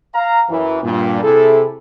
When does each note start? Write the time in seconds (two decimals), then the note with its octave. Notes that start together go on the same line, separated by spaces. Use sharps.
0.14 F5 A#5
0.49 F#2 E3
0.82 G2 A#2
1.23 C3 E4 G#4 A4